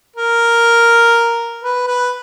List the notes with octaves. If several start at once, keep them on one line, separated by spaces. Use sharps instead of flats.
A#4
B4
B4